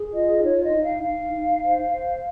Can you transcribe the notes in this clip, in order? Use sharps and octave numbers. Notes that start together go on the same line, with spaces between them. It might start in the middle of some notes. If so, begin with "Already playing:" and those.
Already playing: G#4
F4 D#5
D#4 C#5
D#5
D#4
F5
D#4 F5
D#4
C5
C5